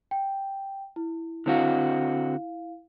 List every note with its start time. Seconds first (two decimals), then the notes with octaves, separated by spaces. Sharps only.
0.11 G5
0.96 E4
1.46 D3 C4 E4 F#4 F5